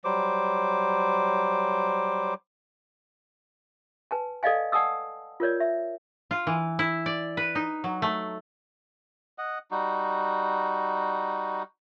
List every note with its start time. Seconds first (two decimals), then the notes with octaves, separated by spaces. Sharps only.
0.04 F#3 G3 C5 D6
4.11 B4 G#5 A5
4.43 A4 D5 D#5 F5 G#5
4.72 D5 F#5 G#5 A5 D#6 E6
5.40 F4 A#4 C#5 D5
5.60 E5
6.31 F4
6.47 E3
6.79 E4
7.06 D5
7.37 B4
7.55 D#4
7.84 F#3
8.02 A3
9.38 D#5 F#5
9.71 G3 D#4 F#4